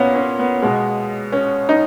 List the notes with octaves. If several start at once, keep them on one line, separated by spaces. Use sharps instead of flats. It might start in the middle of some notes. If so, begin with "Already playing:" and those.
Already playing: A#2 B3 C#4
C#4
B3
B2 G#3
C#4
D#4